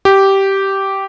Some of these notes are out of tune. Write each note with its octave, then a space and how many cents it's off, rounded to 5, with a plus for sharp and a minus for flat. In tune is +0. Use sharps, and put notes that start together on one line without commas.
G4 -10